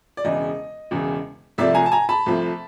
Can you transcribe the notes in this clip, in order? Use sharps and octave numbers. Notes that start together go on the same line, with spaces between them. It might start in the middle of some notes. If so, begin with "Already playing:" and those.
D5
E1 E2 C#3 D#5
E1 E2 C#3
C2 C3 F3 A3 D5 E5
G#5 A#5
A5
G#5 A#5
A5 B5
C2 C3 F3 A3